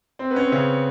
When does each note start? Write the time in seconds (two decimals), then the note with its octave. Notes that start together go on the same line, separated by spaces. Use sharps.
0.19 C4
0.31 B3
0.36 C#4
0.42 C4
0.52 C#3 C#4